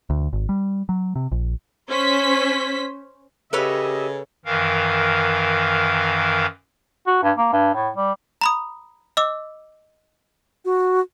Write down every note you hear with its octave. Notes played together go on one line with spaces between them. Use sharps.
D2
G#1
G3
F#3
C3
A#1
C#4 C5 B6
C#3 G4 A4 B4 C#5 D#5 E5
F#2 D#3 E3 A#4 F5
F#4
G2
A#3
G2
A2
G3
A#5 B5 D#6
D#5 D6 E6
F#4